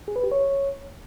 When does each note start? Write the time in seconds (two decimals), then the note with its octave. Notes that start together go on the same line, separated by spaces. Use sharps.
0.08 G#4
0.16 B4
0.24 G4
0.32 C#5